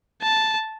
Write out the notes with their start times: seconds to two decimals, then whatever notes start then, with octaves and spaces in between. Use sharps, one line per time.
0.22 A5